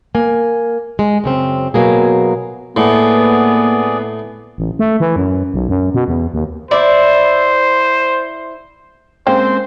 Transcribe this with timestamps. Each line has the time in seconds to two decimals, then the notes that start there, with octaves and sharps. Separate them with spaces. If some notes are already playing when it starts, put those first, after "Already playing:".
0.15 A#3 G#5
0.99 G#3
1.24 F#2 C#3 C4
1.74 B2 F#3 A#3 G#4
2.77 A2 A#3 B3 G#4 D5
4.58 A1
4.79 A3
5.00 E3
5.16 F#2
5.54 B1
5.69 F#2
5.94 B2
6.08 E2
6.34 D#2
6.71 E4 C5 D5
9.27 G#3 A#3 C4 C#4 G#4 C5 G5